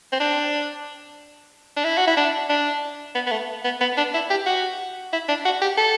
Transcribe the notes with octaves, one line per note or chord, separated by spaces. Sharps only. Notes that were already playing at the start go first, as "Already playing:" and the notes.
C4
D4
D4
E4
F#4
E4
D4
D4
B3
B3
A3
B3
B3
D4
E4
G4
F#4
E4
D4
F#4
G4
A4